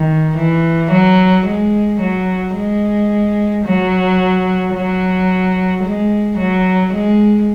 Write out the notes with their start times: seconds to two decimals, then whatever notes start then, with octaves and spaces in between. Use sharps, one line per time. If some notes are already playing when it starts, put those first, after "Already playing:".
Already playing: D#3
0.37 E3
0.91 F#3
1.46 G#3
2.00 F#3
2.55 G#3
3.65 F#3
4.74 F#3
5.83 G#3
6.38 F#3
6.93 G#3